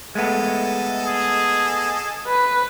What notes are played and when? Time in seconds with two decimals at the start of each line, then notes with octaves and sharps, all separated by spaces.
0.15 G#3 A3 B3 A4 D#5
1.03 G#4
2.27 B4